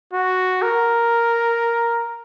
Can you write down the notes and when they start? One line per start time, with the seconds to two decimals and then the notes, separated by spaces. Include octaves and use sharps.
0.13 F#4
0.62 A#4